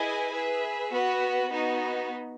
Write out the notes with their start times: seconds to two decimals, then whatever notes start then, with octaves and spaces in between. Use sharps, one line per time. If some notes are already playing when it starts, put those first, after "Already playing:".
Already playing: E4 G#4 B4 D#5 G#5
0.32 G#4 B4 E5
0.92 B3 F#4 B4
1.51 B3 D#4 F#4